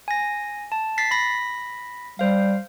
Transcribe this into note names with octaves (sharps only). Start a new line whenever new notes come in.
G#5 A#6
A5
A6 B6 C7
B5 A#6 B6
G3 C5 F5